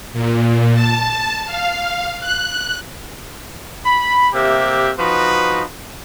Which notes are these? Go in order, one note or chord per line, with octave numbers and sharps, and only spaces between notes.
A#2
A5
F5
F#6
B5
C3 A#3 G4 E5
F3 D#4 F#4 B4